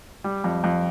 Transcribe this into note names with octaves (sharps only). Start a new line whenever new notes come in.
G3
F2
F2